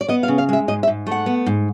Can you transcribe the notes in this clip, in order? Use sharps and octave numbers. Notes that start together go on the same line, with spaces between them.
D5
B3 D#5
F5
C#3
F5
G#3 E5
G#2 D#5
E5
G#2
A3 F#5
B3
G#2